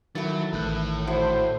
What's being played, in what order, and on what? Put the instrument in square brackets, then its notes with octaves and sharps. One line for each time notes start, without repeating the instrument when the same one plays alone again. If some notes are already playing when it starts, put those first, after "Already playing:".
[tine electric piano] D#3 A6 [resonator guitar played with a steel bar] E3 A3 [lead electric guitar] F#3
[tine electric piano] A1 D#3 F#6 [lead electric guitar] A2
[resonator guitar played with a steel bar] G3 E4 F#4 [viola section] C5